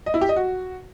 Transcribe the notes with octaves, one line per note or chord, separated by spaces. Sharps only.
D#5
E4
G4
D#5
F#4